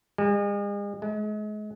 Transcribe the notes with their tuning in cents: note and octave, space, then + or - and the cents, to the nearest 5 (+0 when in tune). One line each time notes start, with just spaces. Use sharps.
G#3 -40
G#3 +35